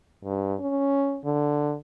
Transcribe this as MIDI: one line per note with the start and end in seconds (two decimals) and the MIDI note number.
0.24 0.55 43
0.60 1.20 61
1.25 1.75 50